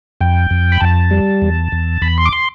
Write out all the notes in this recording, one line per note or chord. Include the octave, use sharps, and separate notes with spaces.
F2 G5
F2
B5
F2 A5
G3
E2
E2
E2 B5
C6
D6
C6